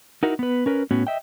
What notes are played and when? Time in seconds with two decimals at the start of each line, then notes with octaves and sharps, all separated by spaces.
0.23 D#4 E4 F#4 A#4
0.39 B3 B4
0.66 C#4 A#4 B4
0.91 A2 B3 C#4 F#4
1.07 D#5 E5 G5